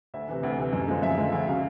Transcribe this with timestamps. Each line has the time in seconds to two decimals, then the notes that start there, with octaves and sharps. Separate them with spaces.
0.14 D2 E5
0.29 C3 E3
0.43 D2
0.58 C3 E3
0.73 F#2
0.88 D3 F3 G#3
1.02 F#2 E5
1.18 D3 F3 G#3
1.32 D2 E5
1.47 C#3 F#3 F5